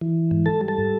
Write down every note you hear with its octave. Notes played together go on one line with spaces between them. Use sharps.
E3
G#2
A4 A5
G3
A4 A5